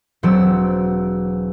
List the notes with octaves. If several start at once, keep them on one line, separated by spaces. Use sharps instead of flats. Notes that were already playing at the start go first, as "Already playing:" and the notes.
E1 F#3 C4 D5 E6